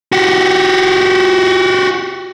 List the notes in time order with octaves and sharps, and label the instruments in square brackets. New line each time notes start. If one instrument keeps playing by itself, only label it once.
[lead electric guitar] F#4 G4